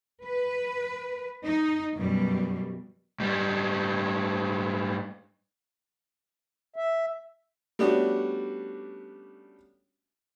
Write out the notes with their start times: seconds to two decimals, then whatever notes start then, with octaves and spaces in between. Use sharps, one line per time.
0.25 B4
1.44 D#4
1.95 F#2 B2 G3
3.20 G#2 G3
6.76 E5
7.79 G3 A3 B3 C#4 D4 F#4